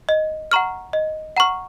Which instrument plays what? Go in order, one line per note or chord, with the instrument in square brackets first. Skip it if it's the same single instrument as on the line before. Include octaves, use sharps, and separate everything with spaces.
[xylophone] D#5
F#5 A#5 C#6 F6
D#5
F#5 A#5 C#6 F6